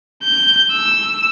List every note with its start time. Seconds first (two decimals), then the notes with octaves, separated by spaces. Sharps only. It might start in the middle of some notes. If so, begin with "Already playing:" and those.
0.24 G6
0.72 E6